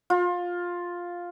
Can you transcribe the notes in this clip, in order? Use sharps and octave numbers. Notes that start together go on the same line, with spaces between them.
F4